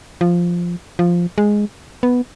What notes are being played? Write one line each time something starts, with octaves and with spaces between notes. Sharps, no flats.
F3
F3
G#3
B3